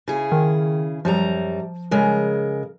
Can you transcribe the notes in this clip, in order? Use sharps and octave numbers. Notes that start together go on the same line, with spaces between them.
C#3 E4 G#4
D#3
F#2 F3 G3 A#5
C#3 G#3 A#4